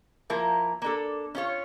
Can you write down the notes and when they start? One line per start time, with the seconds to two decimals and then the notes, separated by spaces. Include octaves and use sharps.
0.30 F3 A#3 E4 A#4
0.82 A#3 D4 A4
1.35 C#4 F4 C#5